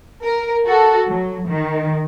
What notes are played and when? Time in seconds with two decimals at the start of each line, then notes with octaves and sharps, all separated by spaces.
0.24 A#4
0.67 F#4 A4
1.08 F#3
1.48 D#3